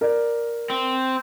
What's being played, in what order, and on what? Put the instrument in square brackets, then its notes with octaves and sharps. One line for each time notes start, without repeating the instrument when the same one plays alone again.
[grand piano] A#4 D5
[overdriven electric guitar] C4